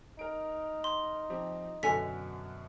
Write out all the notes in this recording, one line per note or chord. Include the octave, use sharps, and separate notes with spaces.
D#4 A#4 D7
C6
F3 C4 G4
F#2 B2 D3 A4 C#5 G#5 B6